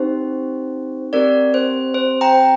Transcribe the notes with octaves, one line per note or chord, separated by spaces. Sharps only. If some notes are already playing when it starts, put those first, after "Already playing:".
Already playing: C4 D#4 G4 C5
C4 G4 A#4 D5
C5
C5
G5 A#5